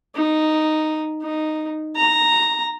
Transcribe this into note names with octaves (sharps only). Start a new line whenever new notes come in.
D#4
D#4
A#5